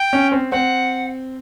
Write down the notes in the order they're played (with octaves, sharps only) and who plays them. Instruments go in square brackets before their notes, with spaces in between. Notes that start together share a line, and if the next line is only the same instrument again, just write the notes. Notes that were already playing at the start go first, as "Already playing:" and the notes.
Already playing: [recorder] G5
[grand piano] C#4
C4
[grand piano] C4 [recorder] F#5